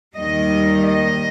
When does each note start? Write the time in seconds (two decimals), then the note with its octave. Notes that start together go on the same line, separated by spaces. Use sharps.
0.17 D#2 D#3 G3 D#5
0.88 D#5